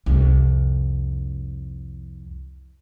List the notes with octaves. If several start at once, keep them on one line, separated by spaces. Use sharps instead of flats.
C2 F2